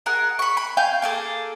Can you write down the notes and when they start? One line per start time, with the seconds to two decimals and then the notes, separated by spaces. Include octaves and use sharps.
0.06 G#4 A#4 F#5
0.39 B5 C#6
0.57 B5
0.77 F5 G5 G#5 G6
1.02 A#3 G#4 A4